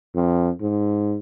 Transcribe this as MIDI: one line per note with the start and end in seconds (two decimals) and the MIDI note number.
0.15 0.50 41
0.61 1.18 44